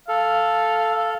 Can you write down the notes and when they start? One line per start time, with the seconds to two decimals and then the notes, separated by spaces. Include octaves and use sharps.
0.08 A4 F5